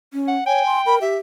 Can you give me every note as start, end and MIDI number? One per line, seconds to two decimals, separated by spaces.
0.13 0.36 61
0.28 0.43 78
0.46 0.65 73
0.46 1.04 79
0.46 0.79 80
0.66 0.81 84
0.86 0.99 70
0.86 0.96 83
1.01 1.16 67
1.01 1.18 76